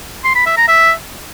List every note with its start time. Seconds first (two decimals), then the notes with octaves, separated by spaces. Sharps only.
0.24 C6
0.35 B5
0.46 E5
0.57 A#5
0.68 E5